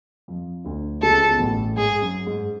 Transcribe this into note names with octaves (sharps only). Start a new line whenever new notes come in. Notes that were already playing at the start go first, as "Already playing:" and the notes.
F2 F3
D2 D3
C#2 C#3 A4
B2
A1 A2
G#2 G#4
F#2
G#2